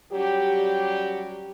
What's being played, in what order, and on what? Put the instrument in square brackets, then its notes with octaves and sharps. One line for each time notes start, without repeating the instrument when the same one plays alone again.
[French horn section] F#3 G3 C#4 G4